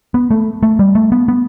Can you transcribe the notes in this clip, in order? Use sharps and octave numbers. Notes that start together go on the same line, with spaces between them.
B3
A3
A3
G3
A3
B3
B3